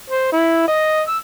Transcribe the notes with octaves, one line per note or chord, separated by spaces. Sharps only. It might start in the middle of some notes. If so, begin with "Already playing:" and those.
C5
E4
D#5
E6